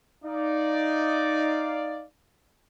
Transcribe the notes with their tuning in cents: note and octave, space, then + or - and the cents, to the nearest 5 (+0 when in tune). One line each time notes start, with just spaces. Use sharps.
D#4 +0 D5 +0 F5 +0